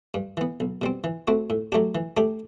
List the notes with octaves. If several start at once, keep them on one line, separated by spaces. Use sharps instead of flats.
G2
E3 B3
B1
B2 G3 C4
E3
A3 C4 F#4
A2
F#3 A3 D4 G4
E3
A3 D4 G4